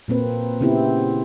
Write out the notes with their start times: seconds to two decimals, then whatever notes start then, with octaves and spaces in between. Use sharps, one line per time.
0.08 A#2 A#3 C4 B4
0.61 C#3 B3 C4 E4 G4